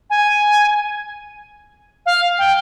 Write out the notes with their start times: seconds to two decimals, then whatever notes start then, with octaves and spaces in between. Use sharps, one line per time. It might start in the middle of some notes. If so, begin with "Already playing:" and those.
0.10 G#5
2.06 F5
2.38 G5